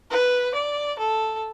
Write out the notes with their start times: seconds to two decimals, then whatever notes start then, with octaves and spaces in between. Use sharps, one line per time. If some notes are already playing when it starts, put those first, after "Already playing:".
0.11 B4
0.54 D5
0.98 A4